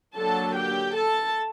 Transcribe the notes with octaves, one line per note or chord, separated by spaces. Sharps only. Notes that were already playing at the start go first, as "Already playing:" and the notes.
D3 F#3 A#3 A4 A5
G4 G5
A4 A5